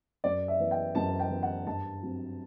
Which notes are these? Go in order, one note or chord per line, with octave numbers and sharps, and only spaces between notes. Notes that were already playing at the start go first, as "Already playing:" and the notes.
F#2 D5
E5
E3 B3
G5
F#2 A5
G5
E3 B3
F#5
G2 A5
F#3 C4